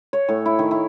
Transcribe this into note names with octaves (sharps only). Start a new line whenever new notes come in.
C#5
A2
E4
D#3
E4